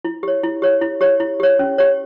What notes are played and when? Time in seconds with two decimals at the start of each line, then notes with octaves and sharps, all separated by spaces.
0.05 E4
0.23 G4 C#5
0.43 E4
0.62 G4 C#5
0.81 E4
1.01 G4 C#5
1.20 E4
1.40 G4 C#5
1.59 C#4
1.78 G4 C#5